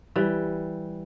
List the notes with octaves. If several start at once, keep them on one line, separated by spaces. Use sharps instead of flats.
E3 G3